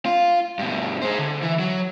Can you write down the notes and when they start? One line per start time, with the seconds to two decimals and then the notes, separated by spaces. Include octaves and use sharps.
0.06 F4
0.59 G2 B2
1.02 G#4 C5
1.19 D3
1.42 E3
1.59 F#3